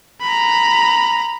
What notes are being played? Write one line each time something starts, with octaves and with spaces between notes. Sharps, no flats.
A#5 B5